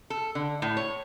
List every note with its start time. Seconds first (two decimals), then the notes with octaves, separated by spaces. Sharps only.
0.10 A4
0.35 D3
0.62 A2
0.77 C#5